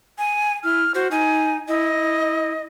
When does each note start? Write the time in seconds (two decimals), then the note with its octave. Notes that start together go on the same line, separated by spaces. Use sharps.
0.18 G#5
0.64 E4 F6
0.95 F#4 C5
1.11 D#4 G#5
1.68 E4 D#5